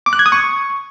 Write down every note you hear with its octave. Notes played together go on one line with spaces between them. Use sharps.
D6
F#6
G#6
D#6
C#6